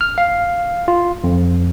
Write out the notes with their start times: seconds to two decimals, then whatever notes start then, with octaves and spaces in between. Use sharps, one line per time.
0.01 F6
0.18 F5
0.88 F4
1.24 F2